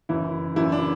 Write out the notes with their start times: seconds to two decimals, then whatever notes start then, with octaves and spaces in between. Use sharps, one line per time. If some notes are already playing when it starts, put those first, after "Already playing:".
0.09 F#1 F#2 E3 E4
0.56 F#1 F#2 E3 E4
0.72 D4